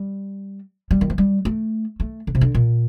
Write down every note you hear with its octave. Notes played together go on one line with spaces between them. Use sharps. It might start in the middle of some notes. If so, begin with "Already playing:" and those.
Already playing: G3
G3
D#3
F3
G3
A3
A3
D3
C3
D3
A#2